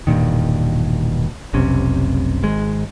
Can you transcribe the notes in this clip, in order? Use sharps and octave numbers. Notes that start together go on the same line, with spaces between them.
E1 G2 A#2 D#3
F1 B1 C3 C#4
G#1 G#2 G#3